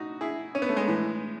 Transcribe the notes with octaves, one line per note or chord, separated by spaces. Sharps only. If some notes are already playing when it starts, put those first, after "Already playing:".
Already playing: A2 D#4 F#4
E4 G#4
C#4
B3
A3
G#3 B3
A2 E3